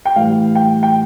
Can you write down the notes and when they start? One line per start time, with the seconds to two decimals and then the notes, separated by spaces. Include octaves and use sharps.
0.05 G5
0.16 A2 E3 G3 F5
0.55 G5
0.83 G5